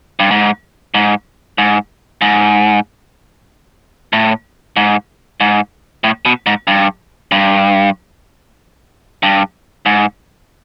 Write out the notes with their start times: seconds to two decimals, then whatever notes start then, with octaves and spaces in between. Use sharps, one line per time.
0.20 G2
0.31 G#2
0.94 G#2
1.58 G#2
2.22 G#2
4.13 A2
4.77 G#2
5.41 G#2
6.04 A2
6.26 B2
6.46 G#2
6.67 G2
7.32 G2
9.23 G2
9.86 G#2